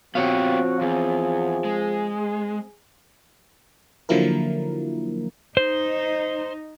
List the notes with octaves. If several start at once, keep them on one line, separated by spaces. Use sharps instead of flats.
F3 B3 C4 F#4 G4 C#5 F5
E2 G#4
G#3
D3 F3 F#3 A#3 E4 A#4
D#4 C5